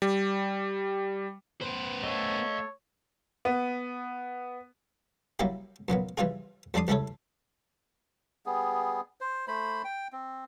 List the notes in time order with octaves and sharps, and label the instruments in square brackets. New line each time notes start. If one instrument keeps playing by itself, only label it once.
[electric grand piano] G3
[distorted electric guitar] B3 C5 [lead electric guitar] B4
[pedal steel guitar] A3 A4 [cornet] C#5 [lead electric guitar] D#5 F5
[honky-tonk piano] B3
[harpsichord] F#3 G3 A#3 C#4 E4 G4
F#2 A#2 F#3 B3
E3 G3 C#4 F4 G#4
F2 G3 D4 D5 C6 D#6
C#2 G3 C#4 E4 A4 C#5
[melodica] G3 B3 G#4
C5
A3 C5 B5
G5
C4